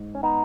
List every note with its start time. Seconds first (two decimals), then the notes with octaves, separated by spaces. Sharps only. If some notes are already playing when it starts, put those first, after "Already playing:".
Already playing: G#2
0.15 C#4
0.23 B3 D#4